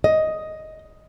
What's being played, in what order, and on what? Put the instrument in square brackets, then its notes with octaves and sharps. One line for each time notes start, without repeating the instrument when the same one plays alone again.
[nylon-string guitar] D#5